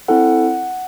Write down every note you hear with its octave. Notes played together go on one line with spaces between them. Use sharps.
C4 E4 A4 F#5